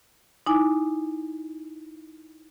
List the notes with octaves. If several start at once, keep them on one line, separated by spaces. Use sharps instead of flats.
D#4 E4 G#5 D6